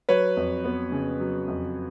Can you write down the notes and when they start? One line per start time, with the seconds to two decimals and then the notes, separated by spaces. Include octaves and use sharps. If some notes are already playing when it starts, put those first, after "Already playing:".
0.09 F#3 B4 C#5
0.37 F2
0.65 B3
0.92 C#3
1.20 F#3
1.48 F2